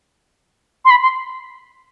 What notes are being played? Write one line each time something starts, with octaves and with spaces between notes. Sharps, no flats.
C6
B5
C6